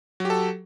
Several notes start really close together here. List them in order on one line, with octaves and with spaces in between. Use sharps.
F#3 G4 A4